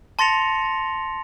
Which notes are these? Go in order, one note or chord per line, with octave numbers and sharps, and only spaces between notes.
A5 C6 A6 A#6 C#7 F7